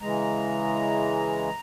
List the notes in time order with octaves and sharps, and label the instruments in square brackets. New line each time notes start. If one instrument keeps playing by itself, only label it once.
[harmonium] C#3 E3 G#3 A#5